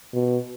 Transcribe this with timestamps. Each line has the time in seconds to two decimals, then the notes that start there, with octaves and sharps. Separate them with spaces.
0.14 B2